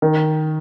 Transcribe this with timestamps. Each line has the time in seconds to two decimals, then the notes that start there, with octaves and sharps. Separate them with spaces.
0.02 D#3